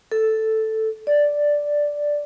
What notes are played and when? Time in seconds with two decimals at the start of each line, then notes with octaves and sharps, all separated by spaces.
0.12 A4
1.07 D5